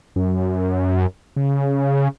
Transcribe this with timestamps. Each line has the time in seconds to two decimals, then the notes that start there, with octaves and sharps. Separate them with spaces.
0.16 F#2
1.36 C#3